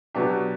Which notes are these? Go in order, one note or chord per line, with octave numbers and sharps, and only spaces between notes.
B2 F#3 B3 D4 G4